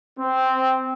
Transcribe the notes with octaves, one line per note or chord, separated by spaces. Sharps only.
C4